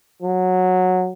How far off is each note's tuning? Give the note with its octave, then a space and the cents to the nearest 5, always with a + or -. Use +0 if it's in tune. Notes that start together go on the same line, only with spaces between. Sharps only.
F#3 -10